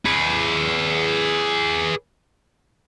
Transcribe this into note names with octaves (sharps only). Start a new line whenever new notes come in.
G#4 B4